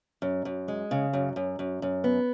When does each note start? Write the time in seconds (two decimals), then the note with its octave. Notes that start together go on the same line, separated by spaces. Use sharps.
0.22 F#2
0.45 F#2
0.68 G#3
0.91 C#3
1.13 F#2
1.36 F#2
1.59 F#2
1.82 F#2
2.04 B3